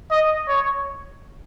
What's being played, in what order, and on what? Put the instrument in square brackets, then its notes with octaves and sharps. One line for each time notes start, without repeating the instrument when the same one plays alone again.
[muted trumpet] D#5
C#5